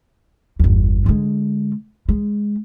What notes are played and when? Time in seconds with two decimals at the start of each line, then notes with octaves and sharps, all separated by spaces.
0.59 G1 E2
1.06 D3 G#3
2.09 G#3